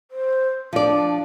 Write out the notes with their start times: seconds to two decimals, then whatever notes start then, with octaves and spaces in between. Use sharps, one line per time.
0.11 C5
0.73 F3 D4 D5